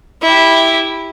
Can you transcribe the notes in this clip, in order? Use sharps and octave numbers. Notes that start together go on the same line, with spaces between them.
E4 G4